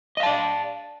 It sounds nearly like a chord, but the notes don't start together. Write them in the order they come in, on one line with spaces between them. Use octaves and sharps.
D#5 F5 A5 D5